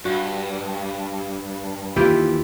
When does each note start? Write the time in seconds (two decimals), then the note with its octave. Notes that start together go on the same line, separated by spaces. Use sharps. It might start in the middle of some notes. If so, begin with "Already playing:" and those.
0.05 G2 F#4
1.96 D#2 E3 E4 F4 G4